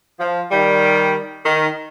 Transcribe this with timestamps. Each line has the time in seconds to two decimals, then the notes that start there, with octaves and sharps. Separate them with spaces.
0.20 F3
0.51 D#3 G3
1.45 D#3